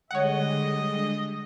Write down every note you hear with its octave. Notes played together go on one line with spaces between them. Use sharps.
D3 G3 G#3 C#5 D#5 F#5